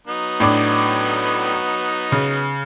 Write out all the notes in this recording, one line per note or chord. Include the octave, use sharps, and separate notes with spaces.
F#3 B3 D#4
A2 D4 D6
C#3